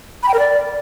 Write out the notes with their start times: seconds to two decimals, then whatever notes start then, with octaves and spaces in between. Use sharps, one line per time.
0.23 B5
0.28 G5
0.34 A#4
0.39 D5